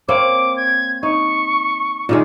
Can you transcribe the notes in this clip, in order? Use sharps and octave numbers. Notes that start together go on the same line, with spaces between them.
A#3 C4 C#5 D6
G#6
D#4 C#6
A#2 D#3 G#3